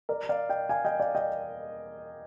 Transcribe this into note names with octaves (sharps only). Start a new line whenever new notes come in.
A#4 D5
D5 F5
D#5 G5
F5 G#5
D#5 G5
D5 F5
D#5 G5